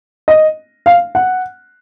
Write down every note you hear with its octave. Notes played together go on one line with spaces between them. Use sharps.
D#5
F5
F#5